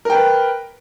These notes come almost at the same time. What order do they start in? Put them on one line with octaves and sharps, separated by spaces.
A#4 G5 B4